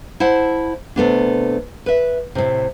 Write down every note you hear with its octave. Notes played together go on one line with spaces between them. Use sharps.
E4 C5 F#5 A5
C3 A3 B3 D4
B4 E5
A2 C3